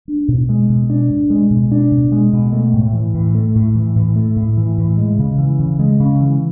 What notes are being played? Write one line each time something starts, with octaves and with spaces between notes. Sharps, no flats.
D4
B2
G#3
B2
D4
B2
G#3
B2
D4
B2
G#3
B2
A3
A2
E3
A2
A3
A2
E3
A2
A3
A2
E3
A2
G#3
C#3
E3
C#3
G#3
C#3
E3